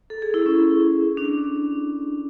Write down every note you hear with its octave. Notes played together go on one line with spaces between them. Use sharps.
A4
G#4
E4
C#4
D4